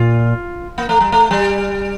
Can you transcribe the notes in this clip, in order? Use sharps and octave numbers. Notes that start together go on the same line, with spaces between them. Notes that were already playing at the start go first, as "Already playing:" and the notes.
Already playing: A#2 F4
A#3
A3
G3
A3
G3